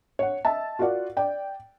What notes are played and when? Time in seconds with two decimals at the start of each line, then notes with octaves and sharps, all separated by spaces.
0.19 C#5 F#5
0.45 D#5 E5 A5
0.79 F4 F#4 A#4 D5 F#5
1.17 D5 G5